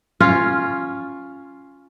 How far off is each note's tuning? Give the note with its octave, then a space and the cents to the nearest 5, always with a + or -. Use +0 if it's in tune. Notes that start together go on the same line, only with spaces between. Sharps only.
C#4 +0 F4 +0 F5 +0